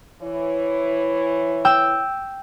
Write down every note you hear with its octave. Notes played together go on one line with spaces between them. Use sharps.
E3 E4 C#5
G5 E6